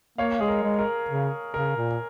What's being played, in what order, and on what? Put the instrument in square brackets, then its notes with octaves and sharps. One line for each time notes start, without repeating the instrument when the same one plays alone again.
[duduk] A#3 [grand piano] C#5 F5
[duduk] G#3 [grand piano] G#4
[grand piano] A#4
[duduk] G#3
[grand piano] A#4
[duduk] C#3
[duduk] C#3 [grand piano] A#4
[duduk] A#2